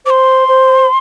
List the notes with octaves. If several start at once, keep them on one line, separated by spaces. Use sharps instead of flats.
C5 C6 D6
C5